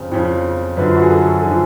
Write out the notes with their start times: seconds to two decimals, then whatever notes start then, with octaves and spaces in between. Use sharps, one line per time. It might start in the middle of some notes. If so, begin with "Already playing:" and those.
Already playing: F2 C#3 F3
0.11 F2 C#3 F3
0.77 F#2 D3 F3 B4
0.88 F4
0.96 F#4
1.02 G#4
1.09 A4
1.42 D3 F3 G#4